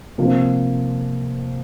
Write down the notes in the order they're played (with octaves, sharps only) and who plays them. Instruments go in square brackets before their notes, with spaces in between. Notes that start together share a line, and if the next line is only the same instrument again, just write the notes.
[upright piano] C3 F3 A#3